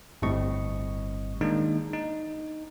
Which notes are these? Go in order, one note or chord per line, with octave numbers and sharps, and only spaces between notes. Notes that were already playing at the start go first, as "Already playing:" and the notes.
G1 A2 G3 C4 D#5 C#6
D#3 G#3 A#3 D4 D#4
D#4